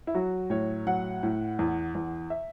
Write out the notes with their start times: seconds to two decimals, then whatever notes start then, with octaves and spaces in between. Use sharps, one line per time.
0.07 E4
0.14 F#3 F#4
0.50 A2 C#5
0.87 F#3 F#5
1.23 A2
1.59 E2
1.95 E2
2.30 E5